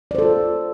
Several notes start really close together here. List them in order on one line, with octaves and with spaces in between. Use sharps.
D5 C5 A4 F4